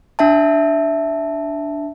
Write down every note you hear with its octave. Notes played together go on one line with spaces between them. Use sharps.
D4 E5 A5